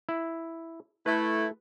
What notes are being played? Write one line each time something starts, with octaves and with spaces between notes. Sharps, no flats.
E4
A3 E4 B4